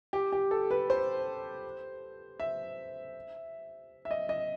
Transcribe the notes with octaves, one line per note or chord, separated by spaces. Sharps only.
G4
G4
A4
B4
C5
E5
E5
D#5
D#5